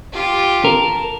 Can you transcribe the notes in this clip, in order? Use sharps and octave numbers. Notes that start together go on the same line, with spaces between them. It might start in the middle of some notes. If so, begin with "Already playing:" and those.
F4 G4
A#4 A5